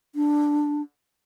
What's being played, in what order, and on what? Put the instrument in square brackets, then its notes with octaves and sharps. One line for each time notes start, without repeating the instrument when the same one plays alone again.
[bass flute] D4